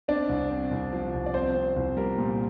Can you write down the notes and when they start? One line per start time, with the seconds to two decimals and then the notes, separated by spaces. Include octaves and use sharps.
0.08 C4 D4 D5
0.29 C2
0.50 C4
0.71 C2
0.93 F3
1.14 C2
1.26 D5
1.34 C4 C5
1.55 C4
1.76 C2
1.97 G3 A#4
2.18 A#2